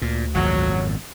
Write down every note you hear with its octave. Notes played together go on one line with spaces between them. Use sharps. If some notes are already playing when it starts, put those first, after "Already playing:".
D2 A#2
G#1 F2 A#2 F#3